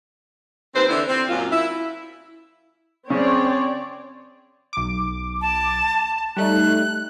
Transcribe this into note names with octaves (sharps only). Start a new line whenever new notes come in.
D#2 C4 B4 C5
D3 E3 E4
C4
F#2 A#2 F4
E4
C#3 C4 C#5 D5
B1 D6
A5
A5
G3 A3 D#4 F#6